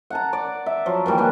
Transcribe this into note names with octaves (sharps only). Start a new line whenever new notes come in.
F#5 A5 A#5
D5
E5
F3 F#3
D#3 E3 G3 A#3
A#3 D4 B4